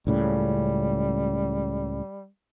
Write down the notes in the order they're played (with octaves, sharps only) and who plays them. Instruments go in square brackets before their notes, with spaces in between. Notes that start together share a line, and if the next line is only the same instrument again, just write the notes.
[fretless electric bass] C#2 A2 C#3 [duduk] G3